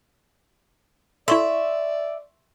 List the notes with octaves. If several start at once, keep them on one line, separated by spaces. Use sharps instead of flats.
E4 A4 D5 E5 C6 C#6